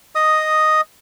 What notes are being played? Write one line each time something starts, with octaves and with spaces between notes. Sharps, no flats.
D#5 D#6